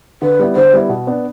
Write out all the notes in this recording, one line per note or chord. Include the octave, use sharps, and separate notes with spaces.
D3 B4
G3 B3 E4
D3 C5
G3 B3 E4
B2
B3 D4